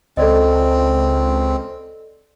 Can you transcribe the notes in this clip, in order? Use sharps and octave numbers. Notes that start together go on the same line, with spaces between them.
C#2 C4 A4 D5 D#5